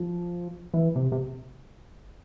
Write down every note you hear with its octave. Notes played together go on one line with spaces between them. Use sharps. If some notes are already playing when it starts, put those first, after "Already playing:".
Already playing: F3
E3
C3
C3